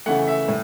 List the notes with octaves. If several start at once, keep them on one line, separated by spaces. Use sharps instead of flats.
C#3 E3 A3 F#5
E5
A2